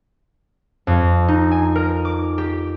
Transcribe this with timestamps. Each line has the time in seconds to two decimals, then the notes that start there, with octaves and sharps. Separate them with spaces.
0.87 F2
1.28 D#4
1.51 G#5
1.76 A#4
2.05 D6
2.38 G4